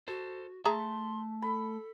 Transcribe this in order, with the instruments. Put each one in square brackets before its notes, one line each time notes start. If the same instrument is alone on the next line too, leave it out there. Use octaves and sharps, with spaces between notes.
[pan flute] F#4 [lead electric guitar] A4 C5
[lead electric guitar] A3 A5 [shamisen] G#4 E5 A#5 [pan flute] C6
[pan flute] A4 [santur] B5